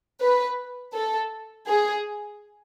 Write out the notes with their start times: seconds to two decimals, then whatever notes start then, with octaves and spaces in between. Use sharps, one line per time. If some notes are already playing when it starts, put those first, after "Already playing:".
0.21 B4
0.95 A4
1.68 G#4